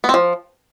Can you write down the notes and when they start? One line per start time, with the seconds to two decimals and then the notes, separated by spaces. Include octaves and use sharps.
0.04 B3
0.09 C4
0.14 F3